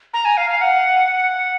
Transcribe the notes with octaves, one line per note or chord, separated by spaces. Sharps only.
A#5
G#5
F5
F5
F#5